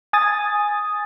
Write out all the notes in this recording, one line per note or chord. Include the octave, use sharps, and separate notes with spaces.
G#5 D#6 A6